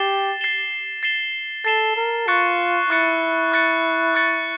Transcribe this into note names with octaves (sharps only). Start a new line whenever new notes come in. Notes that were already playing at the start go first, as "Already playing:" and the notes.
Already playing: G4 A6 C7 E7 G7
A6 C7 E7 G7
A6 C7 E7 G7
A4 A6 C7 E7 G7
A#4
F4 C#6 F#6 A6 C#7
E4 C#6 F#6 A6 C#7
C#6 F#6 A6 C#7
C#6 F#6 A6 C#7